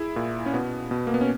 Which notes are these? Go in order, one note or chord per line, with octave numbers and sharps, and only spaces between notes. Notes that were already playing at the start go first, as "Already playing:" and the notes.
Already playing: E4 G#4
A#2
C#4
B2 B3
B2
A#3
B3
C#4